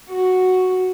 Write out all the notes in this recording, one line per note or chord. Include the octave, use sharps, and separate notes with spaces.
F#4